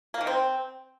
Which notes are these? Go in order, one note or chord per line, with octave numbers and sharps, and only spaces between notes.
A#3
D#3
C4